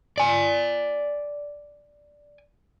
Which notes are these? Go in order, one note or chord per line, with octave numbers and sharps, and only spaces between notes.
D5 G#5